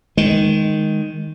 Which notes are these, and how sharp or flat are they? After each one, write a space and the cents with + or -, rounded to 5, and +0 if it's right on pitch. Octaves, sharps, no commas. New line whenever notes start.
D#3 +0 G#3 +0